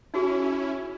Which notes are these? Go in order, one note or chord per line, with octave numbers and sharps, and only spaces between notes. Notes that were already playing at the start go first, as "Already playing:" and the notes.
C#4 D#4 E4 F#4 G#4